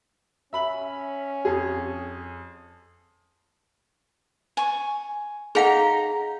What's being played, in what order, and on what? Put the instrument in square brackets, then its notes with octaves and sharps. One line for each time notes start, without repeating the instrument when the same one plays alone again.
[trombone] C#4 [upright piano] E5 B5 F#7
[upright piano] F2 G#4
[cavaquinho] G#5 C#6
[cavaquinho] D#4 A#5 [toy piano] G#4 F5 F#5